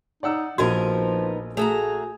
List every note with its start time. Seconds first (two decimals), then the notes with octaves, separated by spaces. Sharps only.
0.23 D#4 D5 F#5 E6
0.58 A#1 F3 B3 D#4 F#4 A#4 C6 G#6
1.57 A3 F#4 G#4 A#5